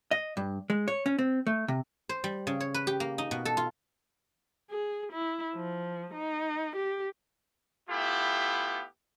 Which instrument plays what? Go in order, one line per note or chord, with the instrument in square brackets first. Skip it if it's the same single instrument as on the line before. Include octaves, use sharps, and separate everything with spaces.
[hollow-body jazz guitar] D#5
G2
G#3
C#5
C#4
C4
A3
C3
[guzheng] C5
G3
C#3
C#5
B4
G4
A#3
D#4
B2
A4
F4
[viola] G#4
E4
F3
D#4
G4
[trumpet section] A3 B3 E4 F4 G4